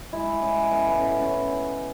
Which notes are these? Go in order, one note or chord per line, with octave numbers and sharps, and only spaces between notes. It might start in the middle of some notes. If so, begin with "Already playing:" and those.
G#3 E4
G#3 C#4
A2 B3
C#4
B3
A2 C#4
C#4